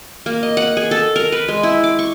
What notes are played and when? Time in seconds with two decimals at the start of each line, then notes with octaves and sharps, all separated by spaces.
0.26 A#3
0.43 D#5
0.57 F#5
0.77 G#4
0.91 A4
1.16 A#4
1.32 B4
1.48 G#3
1.63 E4
1.84 D6
1.99 C#6